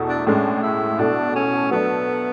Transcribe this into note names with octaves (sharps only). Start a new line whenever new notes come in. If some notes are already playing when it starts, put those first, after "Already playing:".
Already playing: E2 B2 A3 E4 A4
D4
A2 G#3 C#4 D4
E4
B2 A3 D4 E4 A4
C#4
F#3 A3 B3 D4